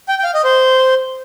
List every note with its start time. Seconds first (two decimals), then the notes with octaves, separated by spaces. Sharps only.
0.09 G5
0.19 G5
0.24 F5
0.34 D#5
0.44 C5